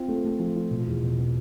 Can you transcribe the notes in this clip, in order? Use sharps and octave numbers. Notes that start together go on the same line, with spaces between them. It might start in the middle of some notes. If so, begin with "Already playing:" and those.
Already playing: C4 F4
A3
A3
F3
F4
B2
E2
B2
B2